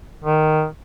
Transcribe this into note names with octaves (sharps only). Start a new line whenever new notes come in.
D#3